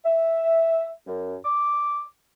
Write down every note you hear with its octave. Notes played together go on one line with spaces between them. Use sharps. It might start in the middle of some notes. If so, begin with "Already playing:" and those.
E5
F#2
D6